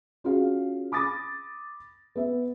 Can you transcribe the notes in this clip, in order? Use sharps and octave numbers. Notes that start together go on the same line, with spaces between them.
C#4 F4 F#4 G#4 F5
B5 D6 D#6 A6 A#6
B3 E5